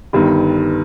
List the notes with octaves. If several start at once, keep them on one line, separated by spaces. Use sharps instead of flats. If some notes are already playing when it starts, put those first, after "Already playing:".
G1 G2 D#3